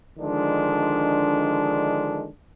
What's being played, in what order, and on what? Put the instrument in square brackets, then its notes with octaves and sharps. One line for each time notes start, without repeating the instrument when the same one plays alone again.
[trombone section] D3 D#3 F3 G#3 D4